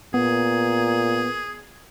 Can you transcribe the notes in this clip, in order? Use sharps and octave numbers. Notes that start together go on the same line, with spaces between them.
A#2 B3 G#4